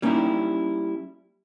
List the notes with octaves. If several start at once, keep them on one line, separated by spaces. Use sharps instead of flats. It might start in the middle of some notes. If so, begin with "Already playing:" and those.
G3 A#3 C#4 D#4 E4 G4